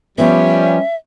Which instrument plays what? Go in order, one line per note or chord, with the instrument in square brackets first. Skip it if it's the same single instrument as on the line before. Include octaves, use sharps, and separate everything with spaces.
[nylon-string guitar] F3 B3 [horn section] G3 C#4 [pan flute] E5